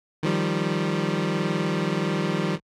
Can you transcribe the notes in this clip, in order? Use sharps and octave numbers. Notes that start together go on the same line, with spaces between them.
D#3 F3 G3